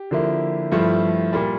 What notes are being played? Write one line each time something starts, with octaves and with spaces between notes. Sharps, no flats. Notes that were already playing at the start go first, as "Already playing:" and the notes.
Already playing: G4
D3 F3 A#3 E4
G2 F3 A3 E4
A#2 G3